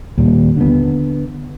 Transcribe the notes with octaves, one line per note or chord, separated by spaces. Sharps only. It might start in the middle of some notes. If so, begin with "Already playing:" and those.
D#2 A#2 D#3 G3
D3 B3